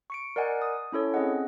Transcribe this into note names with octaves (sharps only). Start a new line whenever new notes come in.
C#6 C#7 D7
A#4 D5 D#5 F#5 G#5
D#6
C#4 E4 A4 C#5
C4 C#4 G#4 D#5 F#5